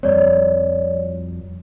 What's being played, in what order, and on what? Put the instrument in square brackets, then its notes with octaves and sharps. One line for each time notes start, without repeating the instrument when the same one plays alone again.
[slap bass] F2 G3 C4 [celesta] C#5 D5